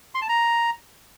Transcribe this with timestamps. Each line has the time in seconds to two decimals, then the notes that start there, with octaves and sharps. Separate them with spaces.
0.15 C6
0.22 A5
0.29 A#5